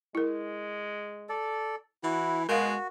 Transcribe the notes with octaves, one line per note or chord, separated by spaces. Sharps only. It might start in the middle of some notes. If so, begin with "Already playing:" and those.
G#3 E4 A#4
A4 D5
E3 E4 F#4
B2 G#3 F#4 A#4 F5